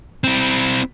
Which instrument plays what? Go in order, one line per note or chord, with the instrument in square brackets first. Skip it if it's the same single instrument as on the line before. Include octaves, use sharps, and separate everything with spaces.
[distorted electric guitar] C4 E4